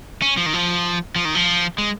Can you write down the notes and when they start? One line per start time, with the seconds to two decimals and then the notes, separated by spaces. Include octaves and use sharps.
0.22 C#4
0.37 F3
0.46 D#3
0.54 F3
1.16 F3
1.25 D#3
1.35 F3
1.78 G#3